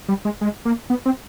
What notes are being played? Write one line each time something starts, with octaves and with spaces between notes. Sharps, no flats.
G3
G#3
G#3
A#3
B3
C4